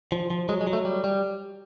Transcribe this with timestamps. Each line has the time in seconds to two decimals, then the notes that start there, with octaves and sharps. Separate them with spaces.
0.12 F3
0.30 F3
0.49 F#3 G#3
0.61 G#3
0.67 F#3
0.73 A3
0.85 G3
1.04 G3